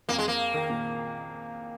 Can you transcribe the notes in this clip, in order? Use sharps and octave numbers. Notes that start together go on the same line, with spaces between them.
F2 A#3
G#3
A#3
D#3
A#2